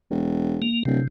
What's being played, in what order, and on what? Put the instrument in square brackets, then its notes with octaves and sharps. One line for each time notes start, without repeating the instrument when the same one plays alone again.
[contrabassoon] E1
[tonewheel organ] A#3
[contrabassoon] D1 [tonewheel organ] C3